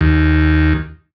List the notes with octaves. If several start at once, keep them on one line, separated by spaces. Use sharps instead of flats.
D#2